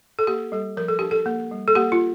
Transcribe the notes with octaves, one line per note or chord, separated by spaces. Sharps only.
A4
A#3 G4
G3 A4
F3 A#4
A4
D4 G4
A4
A#3
G3
A4
A#3 G4
F4